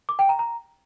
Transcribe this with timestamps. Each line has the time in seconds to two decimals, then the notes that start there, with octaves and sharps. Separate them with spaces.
0.09 D6
0.19 G5
0.29 A#5
0.39 A#5